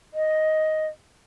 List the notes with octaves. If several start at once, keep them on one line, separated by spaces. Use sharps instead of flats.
D#5